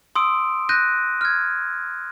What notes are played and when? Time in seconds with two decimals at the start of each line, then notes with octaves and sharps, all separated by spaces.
0.15 C6 D#6 E6 D7
0.69 F#6 G6 A#6 D#7
1.21 F6 G#6